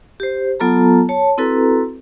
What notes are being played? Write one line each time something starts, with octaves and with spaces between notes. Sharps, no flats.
G4 C5
F#3 B3 F4 A4 A5 A#5
C#5 A5
C4 E4 F#4 A4 B4 A#5